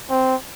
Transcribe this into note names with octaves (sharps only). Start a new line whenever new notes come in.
C4